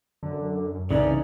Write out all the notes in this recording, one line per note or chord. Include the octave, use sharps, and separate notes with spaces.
F#2 D3
C2 C#3 E3 C#4 D#4 D5